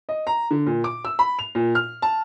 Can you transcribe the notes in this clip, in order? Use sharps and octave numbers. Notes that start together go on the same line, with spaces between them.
D#5
A#5
D3
A#2
D6
E6
B5
F7
A#2
F6
A5